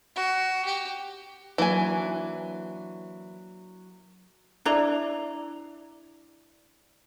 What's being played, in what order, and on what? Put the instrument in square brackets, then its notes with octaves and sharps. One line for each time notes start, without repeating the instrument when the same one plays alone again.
[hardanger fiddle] F#4
G4
[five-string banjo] E3 G#5 [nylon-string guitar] F#3 A#3 D4
[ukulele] D4 E4 D5 A#5